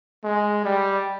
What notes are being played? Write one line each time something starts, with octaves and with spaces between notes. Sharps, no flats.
G#3
G3